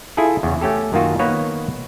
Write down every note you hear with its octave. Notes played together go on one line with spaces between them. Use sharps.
E4 F4 G#4 A4
E2 C#3
A3 C#4 G4 A4
F#2 D#3 A#3 F4 F#4
D#3 A#3 B3 B4 C#5